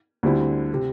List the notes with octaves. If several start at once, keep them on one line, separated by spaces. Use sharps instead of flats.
D2 D3 G3 C4 E4
C3